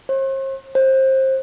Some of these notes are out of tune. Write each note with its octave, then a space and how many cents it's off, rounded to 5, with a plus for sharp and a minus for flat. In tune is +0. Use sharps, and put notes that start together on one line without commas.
C5 +45
C5 +25